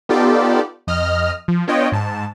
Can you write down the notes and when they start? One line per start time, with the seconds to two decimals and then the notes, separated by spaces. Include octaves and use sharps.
0.09 B3 D#4 F4 G4 A4 D5
0.87 F2 D#5 F6
1.48 F3
1.68 B3 D4 F4 C#5 D#5 G5
1.92 G#2 A5